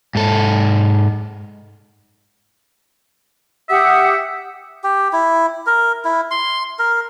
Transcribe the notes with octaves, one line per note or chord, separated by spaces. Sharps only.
G#2 A4
G4 E5 F#5 D#6
G4
E4
A#4
E4
C6
A#4